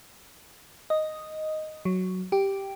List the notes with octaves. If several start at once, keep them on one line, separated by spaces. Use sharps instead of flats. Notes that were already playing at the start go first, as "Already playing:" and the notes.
D#5
F#3
G4